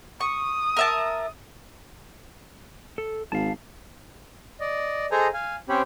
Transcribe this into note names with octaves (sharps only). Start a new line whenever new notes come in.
C#6 D#6
A#4 E5 A5
A4
G#1 F5 A5
D5 D#5
G#4 A4 C5 D#5 G#5 A#5
F5 G#5
C4 C#4 G4 C5 C#5 B5